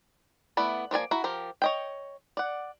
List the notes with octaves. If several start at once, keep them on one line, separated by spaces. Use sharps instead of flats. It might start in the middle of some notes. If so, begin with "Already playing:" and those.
A3 B3 E4 D5
F3 A#3 D5 G#5
E4 F#4 A#5
F3 G4 A#4
C#5 D#5 G5
D5 F#5